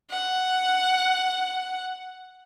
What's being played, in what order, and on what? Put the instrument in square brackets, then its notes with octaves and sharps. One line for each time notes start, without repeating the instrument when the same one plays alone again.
[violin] F#5